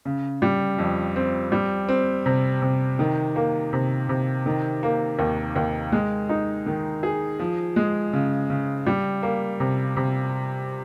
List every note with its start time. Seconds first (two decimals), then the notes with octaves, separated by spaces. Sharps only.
0.05 C#3
0.42 G3
0.79 F2
1.16 C4
1.52 G3
1.88 C4
2.26 C3
2.62 C3
2.99 D#3
3.36 A#3
3.73 C3
4.09 C3
4.46 D#3
4.83 A#3
5.19 D#2
5.56 D#2
5.92 G#3
6.29 D#4
6.66 D#3
7.03 G#4
7.39 F3
7.76 G#3
8.13 C#3
8.50 C#3
8.87 G3
9.23 A#3
9.60 C3
9.97 C3